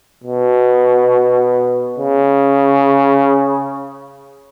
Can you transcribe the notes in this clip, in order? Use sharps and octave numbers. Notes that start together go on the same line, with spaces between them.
B2
C#3